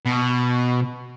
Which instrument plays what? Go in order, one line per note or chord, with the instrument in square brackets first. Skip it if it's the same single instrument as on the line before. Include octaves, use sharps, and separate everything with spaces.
[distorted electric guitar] B2